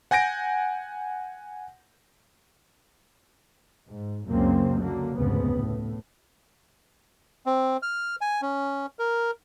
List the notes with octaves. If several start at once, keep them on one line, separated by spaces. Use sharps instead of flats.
F#5 G#5 G6 A#6 D7
G#2
C#2 F#2 C#3 A#3 C4
D3 F#3 A#3
F1 D2 G#2 C#3 B3
A2
C4
F6
G#5
C#4
A#4